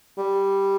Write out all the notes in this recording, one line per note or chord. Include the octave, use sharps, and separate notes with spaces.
G3